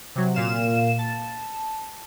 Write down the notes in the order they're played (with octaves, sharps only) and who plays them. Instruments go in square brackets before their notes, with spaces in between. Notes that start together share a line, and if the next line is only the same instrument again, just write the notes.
[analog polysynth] C3 F#3
A#2 F5 E7
A5